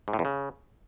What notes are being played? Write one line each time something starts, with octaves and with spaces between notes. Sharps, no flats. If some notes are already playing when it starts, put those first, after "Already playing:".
G#2
A2
E2
C#3